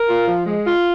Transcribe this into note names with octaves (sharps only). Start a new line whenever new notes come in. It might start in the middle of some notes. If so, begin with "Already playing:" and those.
Already playing: A#4
F4
F3
G#3
F4